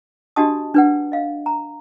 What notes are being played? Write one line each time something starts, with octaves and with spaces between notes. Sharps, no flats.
D4 F#4 G4 D#5 A5 D#6
D4 B4 F#5
D#5 F5
A#5